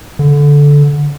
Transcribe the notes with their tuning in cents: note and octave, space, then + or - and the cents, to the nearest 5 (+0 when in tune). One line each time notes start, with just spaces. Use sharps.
D3 -15